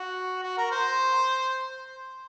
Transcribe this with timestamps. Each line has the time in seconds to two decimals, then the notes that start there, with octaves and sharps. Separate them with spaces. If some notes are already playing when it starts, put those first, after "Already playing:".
Already playing: F#4
0.43 F#4
0.58 A#4
0.71 C5